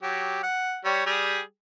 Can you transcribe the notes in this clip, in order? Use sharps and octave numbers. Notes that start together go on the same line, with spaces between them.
F#3 G4
F#5
G3 C#5
G3 G4 G#4